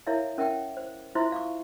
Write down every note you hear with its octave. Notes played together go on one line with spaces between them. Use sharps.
E4 A#4 C#5 E5 F5
C#4 A#4 E5 F#5 G5
C5
E4 F4 C5 E5 C6
F5 C#6 D6